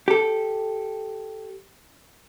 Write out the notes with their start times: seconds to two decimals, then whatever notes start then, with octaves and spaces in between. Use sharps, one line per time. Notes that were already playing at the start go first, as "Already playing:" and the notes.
0.08 G4 A4